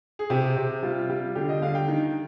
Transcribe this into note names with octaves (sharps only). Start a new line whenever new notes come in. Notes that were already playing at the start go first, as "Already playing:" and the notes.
G#4
C3 G4
C3
G3 F4
G3
D3 G4
D#5
D3 F5
G5
D#3